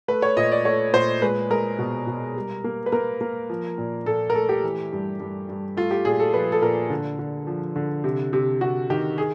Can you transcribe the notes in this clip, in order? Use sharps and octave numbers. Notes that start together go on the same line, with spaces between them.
A3 B4
C#5
A#2 D#5
D5
A3 C#5
A#2 C5
G#3 B4
G#3 A#4
B2
B2
G3
A#3
B4
A#3 A#4
A#3
F3
A#2
A#2 A4
A#4
A3 A4
G4
E3
G2
G2
G2
A3 F4
G4
A#2 G#4
A4
F3 B4
A4
A#2 A#4
D3
D3
F3
D3
C3
C3
C3 F#4
D#3 G4
G#4